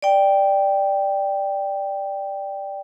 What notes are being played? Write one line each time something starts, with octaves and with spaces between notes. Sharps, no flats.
D5 G5